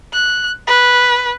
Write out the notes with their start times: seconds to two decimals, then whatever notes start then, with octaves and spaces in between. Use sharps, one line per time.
0.13 F#6
0.68 B4